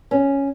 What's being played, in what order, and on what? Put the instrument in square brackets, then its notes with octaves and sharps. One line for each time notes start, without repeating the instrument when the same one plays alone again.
[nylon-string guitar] C#4